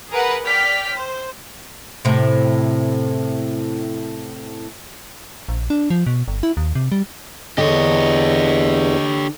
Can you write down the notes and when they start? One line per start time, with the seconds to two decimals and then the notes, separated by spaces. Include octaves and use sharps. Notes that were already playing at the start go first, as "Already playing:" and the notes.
0.11 G#4 A#4 B4 F#5
0.44 D5 G5 F6 B6
0.92 C5
2.05 A2 C3
5.49 A#1
5.70 D4
5.90 F3
6.07 B2
6.28 G1
6.43 E4
6.57 D#2
6.75 C3
6.92 G3
7.58 E2 D3 G4 C#5 D#5